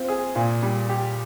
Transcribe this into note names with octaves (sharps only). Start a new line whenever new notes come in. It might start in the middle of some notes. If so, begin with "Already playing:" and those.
Already playing: C4 F4
G#4
A#2
G3
G4